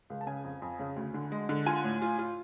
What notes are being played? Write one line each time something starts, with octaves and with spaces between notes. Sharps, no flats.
C#2
A5
C#3 G#5
F2
F2
C#3
D2
D3
G#3
D3
F4 G#5
A2
F4
F4